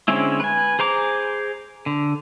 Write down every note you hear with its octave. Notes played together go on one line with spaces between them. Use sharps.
D3 G#3 C4 C#4 E4
B4 G#5
G#4 C5 A#5 D6
D3